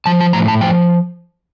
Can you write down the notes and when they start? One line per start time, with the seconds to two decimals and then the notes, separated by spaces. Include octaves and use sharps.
0.06 F3 A5
0.21 A5
0.33 A2 A#5
0.48 A5
0.61 F3 G5